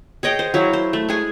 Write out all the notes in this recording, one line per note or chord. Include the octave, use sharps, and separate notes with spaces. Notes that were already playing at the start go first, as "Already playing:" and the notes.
G#4 C#5 D#5 G5
C5
F#3 E4 F5
C5
A3
G#3 G#4 G#5